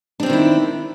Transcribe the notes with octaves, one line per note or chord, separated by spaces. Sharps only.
D#3 C4 D4 E4 F4